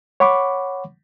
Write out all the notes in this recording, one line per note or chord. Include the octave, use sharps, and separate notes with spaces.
C#5 F#5 B5 C#6 D6